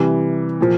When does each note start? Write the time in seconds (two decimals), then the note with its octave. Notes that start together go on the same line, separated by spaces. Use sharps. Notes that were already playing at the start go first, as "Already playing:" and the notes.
Already playing: C3 E3 G3
0.61 A#2 F3